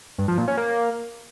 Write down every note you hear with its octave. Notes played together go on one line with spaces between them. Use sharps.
G2
F3
A#2
C#4
A#3